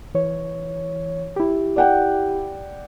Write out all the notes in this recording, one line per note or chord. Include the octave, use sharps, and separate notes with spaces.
E3 C#5
E4 G4
D5 F#5 G5